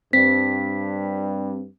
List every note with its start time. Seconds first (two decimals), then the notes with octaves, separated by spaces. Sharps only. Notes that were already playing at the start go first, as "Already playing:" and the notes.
0.13 G2 C4 B6